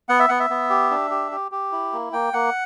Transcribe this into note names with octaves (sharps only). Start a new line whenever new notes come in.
B3 F#5
E5
B3 F#5
E5
B3
G4
D4
G4
G4
G4
E4
A#3
A#3 G5
A#3 F#5